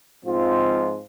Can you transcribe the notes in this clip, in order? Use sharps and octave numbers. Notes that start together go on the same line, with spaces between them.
G#2 F3 G#3 C4 F4